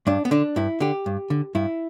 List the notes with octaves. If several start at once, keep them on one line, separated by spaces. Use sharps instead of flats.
G2 D4
B3
D3 D4
G2 E4
D3 G4
G2
D3
G2 E4